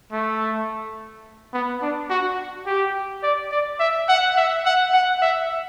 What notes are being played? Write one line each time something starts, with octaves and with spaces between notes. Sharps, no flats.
A3
B3
D4
F#4
G4
D5
D5
E5
F#5
E5
F#5
F#5
E5